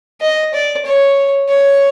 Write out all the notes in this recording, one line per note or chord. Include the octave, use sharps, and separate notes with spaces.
D#5
D5
C#5
C#5